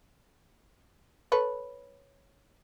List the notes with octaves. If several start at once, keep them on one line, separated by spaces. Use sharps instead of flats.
A4 B4 C#5